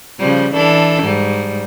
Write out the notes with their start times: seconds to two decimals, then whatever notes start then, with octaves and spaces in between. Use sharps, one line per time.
0.19 C#3 F3 G3
0.53 E3 D4 A4
1.03 G#2 G3